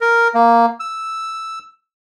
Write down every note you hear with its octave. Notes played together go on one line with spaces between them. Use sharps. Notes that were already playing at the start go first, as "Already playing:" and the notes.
A#4
A#3
E6